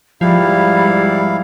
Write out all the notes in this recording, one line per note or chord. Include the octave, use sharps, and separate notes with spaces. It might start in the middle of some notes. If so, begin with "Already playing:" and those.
G#2 F3 G3 E4 F5